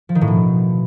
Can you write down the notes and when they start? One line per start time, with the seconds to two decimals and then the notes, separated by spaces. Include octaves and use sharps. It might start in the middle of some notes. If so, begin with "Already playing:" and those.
0.09 F3
0.15 D#3
0.21 A2
0.28 B2